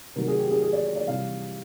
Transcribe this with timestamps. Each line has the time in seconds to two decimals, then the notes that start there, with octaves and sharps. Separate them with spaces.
0.16 C3 D#3 F#3 A3 A#4
0.28 G#4
0.39 G4
0.50 G#4
0.62 G#4
0.73 D5
0.84 C#5
0.96 D5
1.07 C3 E3 G3 F5